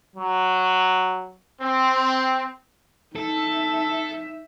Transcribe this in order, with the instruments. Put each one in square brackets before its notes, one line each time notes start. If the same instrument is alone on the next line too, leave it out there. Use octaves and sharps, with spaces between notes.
[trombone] F#3
[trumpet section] C4
[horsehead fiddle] D#4 E5 [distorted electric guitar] A4